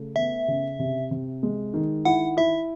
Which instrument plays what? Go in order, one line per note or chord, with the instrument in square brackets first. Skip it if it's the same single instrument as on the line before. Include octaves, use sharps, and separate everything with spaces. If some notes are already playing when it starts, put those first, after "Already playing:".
Already playing: [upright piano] C#3 A3
[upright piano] B3 [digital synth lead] E5
[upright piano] C#3
C3
C3
G#3
D#3
[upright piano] E4 [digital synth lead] F#5
[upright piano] E4 [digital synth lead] E5